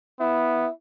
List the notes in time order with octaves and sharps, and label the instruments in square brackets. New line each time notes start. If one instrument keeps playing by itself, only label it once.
[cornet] B3 [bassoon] E4